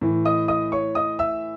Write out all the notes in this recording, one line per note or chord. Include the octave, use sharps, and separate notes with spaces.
A2 E3
D#5 D#6
D#5 D#6
C#5 C#6
D#5 D#6
E5 E6